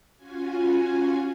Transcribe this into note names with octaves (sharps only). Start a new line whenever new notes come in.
C#4 F4 F#4 G#5